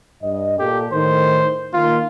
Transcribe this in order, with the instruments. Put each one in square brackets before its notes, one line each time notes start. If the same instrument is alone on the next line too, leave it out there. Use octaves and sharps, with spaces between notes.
[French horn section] G2 D#5
[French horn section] A#2 A#3 A4 [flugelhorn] G4
[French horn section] A2 D#3 [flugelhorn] C5
[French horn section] D#3 A#3 [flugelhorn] F4